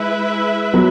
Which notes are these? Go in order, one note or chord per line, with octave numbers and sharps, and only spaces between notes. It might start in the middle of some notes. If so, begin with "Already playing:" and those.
Already playing: G#3 E4 B4 E5
F#3 B3